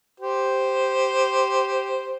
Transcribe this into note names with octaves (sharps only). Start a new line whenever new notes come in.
G4 C5